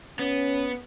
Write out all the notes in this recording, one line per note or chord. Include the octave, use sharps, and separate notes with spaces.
B3 C#4